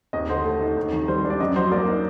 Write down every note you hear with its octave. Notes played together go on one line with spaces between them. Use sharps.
D#2 D#5
D3 C5
A3
D#4
D#2
D#3
G3 C5
D4
D5
F#2 D#5
F#3 C5
A#3 D5
D#4